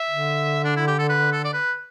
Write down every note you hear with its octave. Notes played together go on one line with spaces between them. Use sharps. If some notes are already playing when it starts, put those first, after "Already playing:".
Already playing: E5
D3
D4
E4
G4
A4
B4
A4
D5
B4